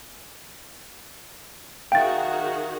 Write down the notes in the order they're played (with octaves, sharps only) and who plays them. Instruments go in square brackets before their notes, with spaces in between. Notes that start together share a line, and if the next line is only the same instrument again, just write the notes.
[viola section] D#3 F#4 G#4 [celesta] E5 F5 [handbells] G5 A6